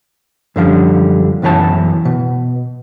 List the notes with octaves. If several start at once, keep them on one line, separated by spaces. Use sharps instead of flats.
F#2 D3 F3 G3
B1 F#2 E3 C#5 A5
B2